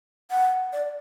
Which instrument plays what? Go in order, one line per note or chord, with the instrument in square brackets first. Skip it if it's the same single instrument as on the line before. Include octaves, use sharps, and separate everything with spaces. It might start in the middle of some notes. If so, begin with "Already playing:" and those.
[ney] F#5
D5